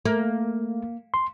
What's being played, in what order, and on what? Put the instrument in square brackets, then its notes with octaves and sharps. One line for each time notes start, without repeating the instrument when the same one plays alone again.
[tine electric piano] A3 [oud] A#3
[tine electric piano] C6